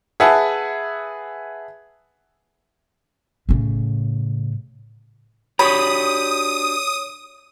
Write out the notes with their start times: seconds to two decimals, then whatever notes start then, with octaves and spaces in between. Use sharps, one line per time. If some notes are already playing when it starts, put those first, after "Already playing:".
0.20 G#4 B4 E5 F#5 A5
3.49 A2 C#3
5.59 D4 F#4 G4 C#5 B5 D#6